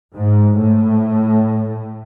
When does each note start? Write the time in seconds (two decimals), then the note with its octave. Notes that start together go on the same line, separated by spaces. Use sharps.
0.15 G#2
0.59 A2